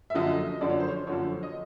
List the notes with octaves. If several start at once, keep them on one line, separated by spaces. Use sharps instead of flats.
E5
F#2 D3 F3 D#5
F#2 D3 F3 D5
C#5
C5
C#5
F#2 D3 F3 C#5
D#5